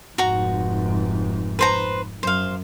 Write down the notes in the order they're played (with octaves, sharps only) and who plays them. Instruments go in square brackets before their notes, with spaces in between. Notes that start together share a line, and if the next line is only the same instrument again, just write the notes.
[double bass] F1 G#2 [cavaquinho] F#4 A#5
[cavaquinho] B4 C5 A#5
[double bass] F#2 [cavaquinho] C5 F5